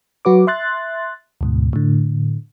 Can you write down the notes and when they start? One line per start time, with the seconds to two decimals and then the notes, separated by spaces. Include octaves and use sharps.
0.25 F#3 F#4 B4 D6
0.47 E5 C6 F#6 A6
1.41 D2 G#2 B2
1.73 A2 D3